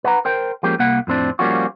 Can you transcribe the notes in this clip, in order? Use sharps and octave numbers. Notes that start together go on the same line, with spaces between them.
B4 F#5 A#5
A#4 C5 G5
F3 G#3 A#3 C#4 G4
C2 A#3 F#5
F2 A2 C4 D4
F3 G3 A#3 C#4 F4 F#4